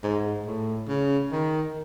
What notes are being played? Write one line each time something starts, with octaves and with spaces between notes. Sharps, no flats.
G#2
A2
C#3
D#3